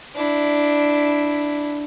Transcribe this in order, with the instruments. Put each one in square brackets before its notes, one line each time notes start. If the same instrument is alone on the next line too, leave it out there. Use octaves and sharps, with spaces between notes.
[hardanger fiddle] D4 E4